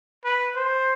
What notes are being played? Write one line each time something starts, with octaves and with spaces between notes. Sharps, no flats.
B4
C5